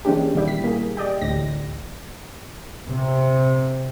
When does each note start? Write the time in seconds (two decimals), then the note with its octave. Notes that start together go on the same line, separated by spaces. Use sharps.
0.05 E3 G#3 A#3 C#4 D4 G4
0.34 A#2 D#3 G3 E4 G4
0.48 B6
0.64 A#3 G#4
0.97 G4 D5 D#5 G5
1.21 A1 D2 A2 A#6
2.88 C3